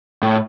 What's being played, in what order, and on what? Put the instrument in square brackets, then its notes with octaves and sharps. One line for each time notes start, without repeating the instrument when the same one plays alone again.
[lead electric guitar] A2